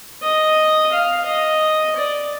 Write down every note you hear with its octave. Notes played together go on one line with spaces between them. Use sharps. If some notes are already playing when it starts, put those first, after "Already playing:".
D#5
F5
D#5
D5